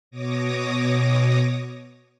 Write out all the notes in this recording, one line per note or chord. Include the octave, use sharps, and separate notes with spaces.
B2 C#5 D6 D#6 A#6